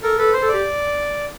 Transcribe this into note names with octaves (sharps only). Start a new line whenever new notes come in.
A4 A#4
A4 B4
C5
A4
D5
G4